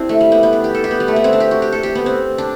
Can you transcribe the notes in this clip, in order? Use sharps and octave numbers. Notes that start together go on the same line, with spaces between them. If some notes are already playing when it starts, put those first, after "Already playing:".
Already playing: C4 D4 E4 G4
A3
G3
B3
B3
D4
G4
A4
G4
B3
G3
A3
B3
C4
D4
G4
F#4
G4
A4
G4
B3
C4
D4